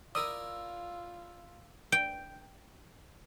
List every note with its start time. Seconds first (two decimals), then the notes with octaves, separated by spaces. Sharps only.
0.15 E4 F4 A#4 D5 D#6 E6
1.92 G5